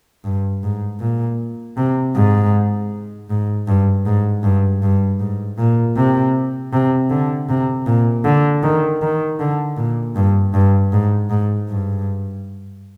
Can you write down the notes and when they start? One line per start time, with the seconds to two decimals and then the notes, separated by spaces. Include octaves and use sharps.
0.24 G2
0.63 G#2
1.00 A#2
1.77 C3
2.15 G#2
3.30 G#2
3.68 G2
4.06 G#2
4.43 G2
4.82 G2
5.20 G#2
5.58 A#2
5.96 C3
6.73 C3
7.10 D3
7.49 C3
7.87 A#2
8.24 D3
8.63 D#3
9.02 D#3
9.40 D3
9.77 A#2
10.16 G2
10.54 G2
10.92 G#2
11.30 G#2
11.69 G2